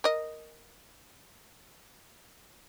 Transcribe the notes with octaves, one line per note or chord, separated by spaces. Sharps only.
A#4 D#5